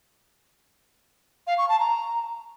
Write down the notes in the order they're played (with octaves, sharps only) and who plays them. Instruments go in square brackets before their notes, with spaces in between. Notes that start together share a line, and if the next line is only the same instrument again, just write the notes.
[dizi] F5
C#6
A5
A#5